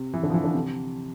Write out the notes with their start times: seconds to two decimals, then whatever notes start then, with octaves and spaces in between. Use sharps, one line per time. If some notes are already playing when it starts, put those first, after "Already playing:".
Already playing: C3
0.14 E3
0.23 D3
0.30 F3
0.34 E3
0.44 D3
0.54 C3